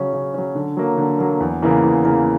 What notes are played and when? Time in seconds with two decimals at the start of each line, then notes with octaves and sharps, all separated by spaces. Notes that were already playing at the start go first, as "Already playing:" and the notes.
Already playing: C#3 F#3 C#4
0.13 C#3
0.34 F#3 C#4
0.55 D3
0.77 F#3 A#3
0.98 D3
1.19 F#3 A#3
1.40 E2
1.62 C#3 E3 A#3
1.83 E2
2.05 C#3 E3 A#3